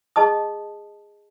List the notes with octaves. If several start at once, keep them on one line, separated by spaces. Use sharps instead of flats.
G#4 D#5 A5 D#6